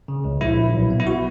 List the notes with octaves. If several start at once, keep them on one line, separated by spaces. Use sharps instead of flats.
C#3
C#2
A#1 E4
A#1
B1
B3
E4
F#4